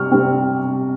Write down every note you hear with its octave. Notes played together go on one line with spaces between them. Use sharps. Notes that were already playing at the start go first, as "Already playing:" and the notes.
Already playing: C3 G3 C4 C#6 F6
C3 G3 C4